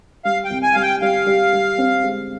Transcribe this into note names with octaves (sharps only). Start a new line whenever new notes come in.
G3 F5
G5
C2
G#5
G3 F5
G5
G3 F5
G3
G3
C4
G#3